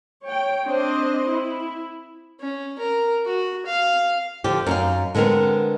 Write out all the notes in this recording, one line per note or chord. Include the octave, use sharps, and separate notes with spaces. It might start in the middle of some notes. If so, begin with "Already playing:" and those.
C#5 G5
C4 D4 C5 D#5
E4
C#4
A#4
F#4
F5
D3 F3 G4
F#2 D#4 F5
D3 G#3 B3 C4 A#4